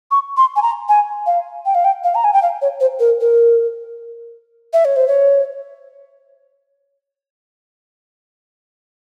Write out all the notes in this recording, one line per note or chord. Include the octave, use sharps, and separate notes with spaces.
C#6
C6
G#5
A#5
G#5
F5
G5
F5
G5
F5
A#5
G#5
G5
F5
C#5
C5
A#4
A#4
E5
C#5
C5
C#5